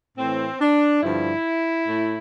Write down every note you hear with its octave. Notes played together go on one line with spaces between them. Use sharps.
A2 E3 C4
D4
G2 D3 F3 E4
A2